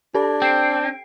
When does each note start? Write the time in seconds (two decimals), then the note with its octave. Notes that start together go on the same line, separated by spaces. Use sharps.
0.15 D4 G4 A4
0.42 C4 G5 C7 D7